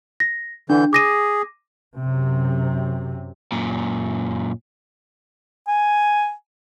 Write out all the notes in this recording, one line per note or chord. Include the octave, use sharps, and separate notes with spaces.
A#6
D3 E3 D4 G6
G#4 D6 A#6 D#7
F#2 C3
F#2 A#2
G#5